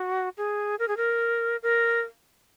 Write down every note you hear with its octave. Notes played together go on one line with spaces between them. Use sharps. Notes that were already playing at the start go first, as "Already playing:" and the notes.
Already playing: F#4
G#4
A#4
G#4
A#4
A#4